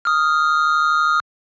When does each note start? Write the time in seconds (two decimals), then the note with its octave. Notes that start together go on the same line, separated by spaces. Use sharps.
0.05 D#6 F6